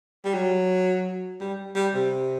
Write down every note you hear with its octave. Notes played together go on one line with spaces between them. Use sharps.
G3
F#3
G3
G3
C3